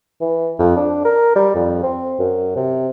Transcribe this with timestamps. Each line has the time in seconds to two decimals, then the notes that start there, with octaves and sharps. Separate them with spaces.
0.21 E3
0.59 F2
0.76 D4
1.05 A#4
1.35 G3
1.55 F2
1.83 C4
2.19 F#2
2.56 C3